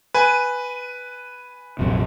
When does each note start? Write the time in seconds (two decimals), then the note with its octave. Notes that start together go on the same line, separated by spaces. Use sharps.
0.14 B4 G#5
1.79 A#1 F#2 C3